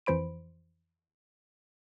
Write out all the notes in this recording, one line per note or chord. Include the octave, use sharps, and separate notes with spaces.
F2 E3 C5 B5 D7